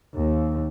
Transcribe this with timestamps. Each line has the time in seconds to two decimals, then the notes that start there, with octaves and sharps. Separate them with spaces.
0.13 D#2